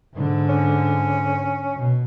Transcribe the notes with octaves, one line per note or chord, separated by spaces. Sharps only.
G#2 D3
C#4
B2